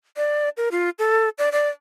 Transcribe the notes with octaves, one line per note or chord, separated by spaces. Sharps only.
D5
A#4
F4
A4
D5
D5